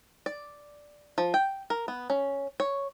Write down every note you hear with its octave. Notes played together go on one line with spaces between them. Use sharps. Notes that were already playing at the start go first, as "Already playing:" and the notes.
D5
F3
G5
A#4
B3
C#4
C#5